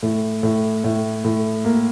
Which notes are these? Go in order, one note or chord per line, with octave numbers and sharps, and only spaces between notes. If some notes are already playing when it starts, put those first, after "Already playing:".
A2
A2
A2
A2
A#3